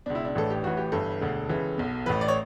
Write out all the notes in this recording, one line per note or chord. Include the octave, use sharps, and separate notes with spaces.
C#2 B2 D4
E4
D4
A1 A2 E3 A4
G4
A1 A2 E3 F#4
G4
G1 G2 E3 A4
E1 D2 D3
C#2 C#3 E3
B1 B2
A1 A2 E3 B4
D5
C#5